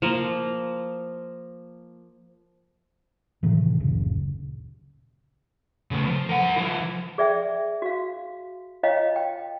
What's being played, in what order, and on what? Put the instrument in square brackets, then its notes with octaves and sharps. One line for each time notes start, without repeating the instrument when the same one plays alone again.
[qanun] F3 A#3
[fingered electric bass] A2 C3 D#3 E3
F#1 D2 A#2 C#3
[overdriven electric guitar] C#3 A3
F3
A#4 F#5
F3 E4
[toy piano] G#4 D5 E5 G5
F#4 F5
F4 C#5 D#5 F5 G5 A#5
G5